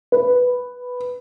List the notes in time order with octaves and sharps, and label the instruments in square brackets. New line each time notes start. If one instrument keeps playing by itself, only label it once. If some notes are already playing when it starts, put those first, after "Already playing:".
[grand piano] B4